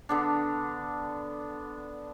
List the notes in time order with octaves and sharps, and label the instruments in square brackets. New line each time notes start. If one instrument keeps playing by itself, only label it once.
[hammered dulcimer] D3 B3 D4